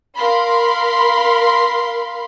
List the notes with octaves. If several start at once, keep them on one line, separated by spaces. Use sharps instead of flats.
A#4 F5 B5 C6